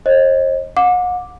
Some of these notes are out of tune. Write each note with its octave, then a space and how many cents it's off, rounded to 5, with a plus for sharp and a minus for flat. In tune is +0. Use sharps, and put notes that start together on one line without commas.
C5 +45 D#5 +0
F#5 -40 D6 +0